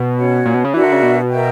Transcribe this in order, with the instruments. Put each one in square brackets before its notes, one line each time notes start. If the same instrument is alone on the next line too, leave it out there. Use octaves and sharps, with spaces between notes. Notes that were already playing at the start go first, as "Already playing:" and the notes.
Already playing: [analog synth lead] B2
[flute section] C#4 F#4 C#5 F#5
[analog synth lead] A#2
B2
C#3
[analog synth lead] E3 [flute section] D4 F#4 A#4 E5
[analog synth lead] D3
C#3
B2
[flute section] A#4 E5 G5